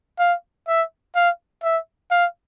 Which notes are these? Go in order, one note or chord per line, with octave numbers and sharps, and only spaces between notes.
F5
E5
F5
E5
F5